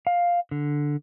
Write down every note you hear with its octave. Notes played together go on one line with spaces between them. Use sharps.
F5
D3